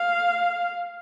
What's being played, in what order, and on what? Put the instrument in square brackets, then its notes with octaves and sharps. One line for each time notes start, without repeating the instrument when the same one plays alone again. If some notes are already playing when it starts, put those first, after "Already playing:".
Already playing: [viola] F5